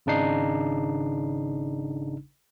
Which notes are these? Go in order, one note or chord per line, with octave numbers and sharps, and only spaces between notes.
G#1 C#3 D4 D#4 C7